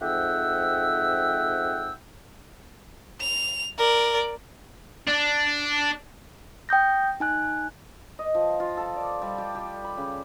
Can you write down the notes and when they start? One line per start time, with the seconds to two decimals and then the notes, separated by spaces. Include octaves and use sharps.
0.01 F2 G#2 E5 F#5 G5 E6
3.21 F7
3.78 A#4 D5
5.08 D4
6.69 G5 D#6 G6 A#6
7.20 D#4 G#5 F#6
8.19 D#5
8.35 F3
8.60 F4
8.77 A4
8.96 D5
9.22 G3
9.38 G4
9.55 G4
9.84 B5
9.98 C#3